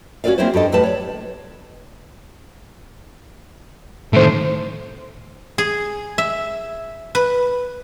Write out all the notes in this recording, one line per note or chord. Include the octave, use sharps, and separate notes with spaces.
C#4 F#4 A4 B4 D5 F5
A#3 C4 C#4 E4 G#4 C5
G2 G4 A4 D#5
E2 A2 G3 B4 A5
C#5 D5
A2 D#3 A3 C5
G#4
E5
B4